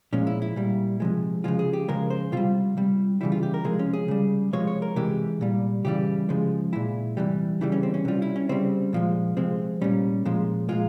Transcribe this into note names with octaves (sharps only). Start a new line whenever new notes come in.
A#2 F3 G#3 C#4
E4
E4
A#2 G3
C3 F3 G#3
C#3 F3 G#3 F4
G#4
G4
C#3 F3 G#3 A#4
C5
C3 G3 F4
C3 G3
C#3 E3 G3 E4
F4
G4
A#4
C3 F3 G#3 G#4
C#4
G#4
C#3 G3
C3 F3 G#3 C#5
C#5
A#4
C3 E3 G#3 G4
A#2 G3
C#3 E3 G3 G4
C#3 F3 G#3
A#2 G#3 E4
C3 E3 G3
C#3 E3 G3 E4
C#4
C4
C#4
C3 G3 F4
E4
C#4
C#3 G3 C4
A#2 F3 G#3
C3 F3 G#3 C4
A#2 G3 C#4
A#2 F3 G#3
A#2 F3 G#3 F4